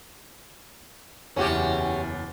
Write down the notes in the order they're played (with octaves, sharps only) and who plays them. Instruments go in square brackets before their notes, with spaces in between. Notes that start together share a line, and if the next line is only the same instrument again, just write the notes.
[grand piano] F#1 E2 [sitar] C#4 F#4 G4